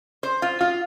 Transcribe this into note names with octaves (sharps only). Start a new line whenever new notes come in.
C5
F4
F4